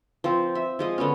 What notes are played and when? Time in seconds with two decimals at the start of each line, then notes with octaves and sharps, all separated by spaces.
0.24 F3 C4
0.55 E5
0.79 F3 G#3 D#5
0.98 D3 G#3 B3 C#4